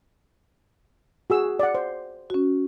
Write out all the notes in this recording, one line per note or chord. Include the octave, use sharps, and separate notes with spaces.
F#4 G#4 E6
D5 F#5
C5
C#4 F#4